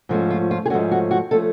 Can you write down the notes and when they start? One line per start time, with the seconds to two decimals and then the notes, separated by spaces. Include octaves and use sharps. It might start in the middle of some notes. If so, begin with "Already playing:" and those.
0.09 G#2 F3 A3 C#4
0.30 F4
0.51 F4
0.66 G#4
0.70 G#2 F3 A3 C#4 F#4
0.91 F#4
1.11 F#4
1.31 F3 A3 C#4 A4